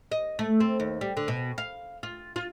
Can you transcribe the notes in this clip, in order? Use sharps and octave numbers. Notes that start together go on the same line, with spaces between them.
D#5
A3
C4
D#2
G3
D3
B2
F5
F4
F4